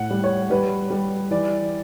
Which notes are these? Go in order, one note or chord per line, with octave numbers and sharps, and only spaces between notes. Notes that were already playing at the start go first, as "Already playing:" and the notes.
Already playing: A2 F#5
G3
C#5
G3 B4
G3
E3 D5